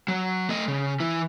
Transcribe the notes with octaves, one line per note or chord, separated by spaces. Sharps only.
F#3
A3 D#5
C#3
E3 E4